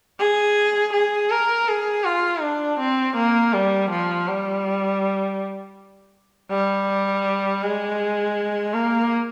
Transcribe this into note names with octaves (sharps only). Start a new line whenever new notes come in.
G#4
G#4
A#4
G#4
F4
D4
C4
A#3
G3
F3
G3
G3
G#3
A#3